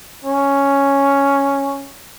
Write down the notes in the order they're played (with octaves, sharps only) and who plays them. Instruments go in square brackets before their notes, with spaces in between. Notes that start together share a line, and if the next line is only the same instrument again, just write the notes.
[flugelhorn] C#4